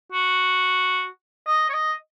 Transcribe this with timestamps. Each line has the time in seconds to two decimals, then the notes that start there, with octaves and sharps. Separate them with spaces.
0.12 F#4
1.47 D#5
1.69 C#5
1.74 D#5